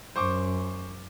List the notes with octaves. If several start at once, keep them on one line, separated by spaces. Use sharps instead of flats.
F#2 C5 C#6 D6